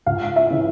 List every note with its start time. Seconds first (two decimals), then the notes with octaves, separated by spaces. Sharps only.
0.06 C#2 F5
0.36 E5
0.50 C#3 E3